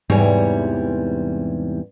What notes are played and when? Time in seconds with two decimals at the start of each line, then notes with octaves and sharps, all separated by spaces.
0.10 E2 G#2 C3 E3 G3 C#5